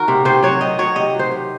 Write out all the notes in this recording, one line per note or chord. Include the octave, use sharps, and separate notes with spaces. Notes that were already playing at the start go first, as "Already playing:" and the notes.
Already playing: D#3 F#4 A#4
C3
C3 C5
F#3 C#5
D#3 D#5
F#3 C#5
C3 D#5
F#3 C5
C3